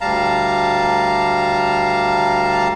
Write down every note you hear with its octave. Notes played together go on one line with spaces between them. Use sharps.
D2 G3 F5 A5 A#5